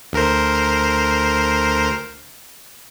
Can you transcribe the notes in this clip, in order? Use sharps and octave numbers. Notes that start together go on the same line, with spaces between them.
D2 A#4 C5